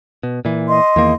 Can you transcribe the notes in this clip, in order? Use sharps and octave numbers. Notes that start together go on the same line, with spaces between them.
B2
A#2 E3
D#5 C6
E2 D#3 A#3